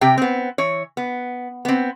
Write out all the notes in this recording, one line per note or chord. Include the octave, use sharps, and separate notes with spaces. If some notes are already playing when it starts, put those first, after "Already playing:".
C3 G4 G5
B3 C4
E3 C#5
B3
B3 C4